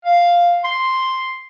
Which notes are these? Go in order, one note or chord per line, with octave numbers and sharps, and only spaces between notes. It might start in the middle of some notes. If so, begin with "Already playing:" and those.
F5
C6